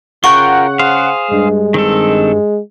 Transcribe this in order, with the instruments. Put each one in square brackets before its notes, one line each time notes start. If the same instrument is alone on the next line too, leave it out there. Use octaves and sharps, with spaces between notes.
[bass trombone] C#3 [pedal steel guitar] F4 A#4 G5 [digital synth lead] F#5 [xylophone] C#6
[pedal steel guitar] G#4 C5 F5
[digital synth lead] G2 [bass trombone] G#3
[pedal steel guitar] D#3 C4 A4